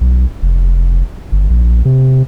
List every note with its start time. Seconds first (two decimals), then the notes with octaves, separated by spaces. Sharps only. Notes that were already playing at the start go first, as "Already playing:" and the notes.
0.01 B1
0.42 F1
1.32 G1
1.50 A#1
1.85 C3